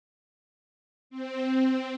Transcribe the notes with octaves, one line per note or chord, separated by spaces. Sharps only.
C4